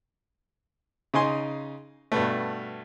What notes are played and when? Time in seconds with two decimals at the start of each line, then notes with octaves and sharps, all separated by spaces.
1.14 C#3 D#4 G#5 C6
2.12 G2 B2 A3